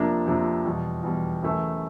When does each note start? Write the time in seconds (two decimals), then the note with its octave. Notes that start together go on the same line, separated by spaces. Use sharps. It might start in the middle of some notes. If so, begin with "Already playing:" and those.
Already playing: F2 C3 F3 A#3 D4
0.26 F2 C3 F3 A#3 D4
0.65 E2 B2 G3
1.03 E2 B2 G3
1.43 F#2 C#3 E3 A3